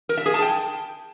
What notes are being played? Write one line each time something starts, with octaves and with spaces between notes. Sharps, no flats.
A#4
E5
G#4
A5
G5